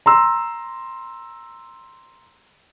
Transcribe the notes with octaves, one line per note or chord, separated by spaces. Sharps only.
A#5 C6 E6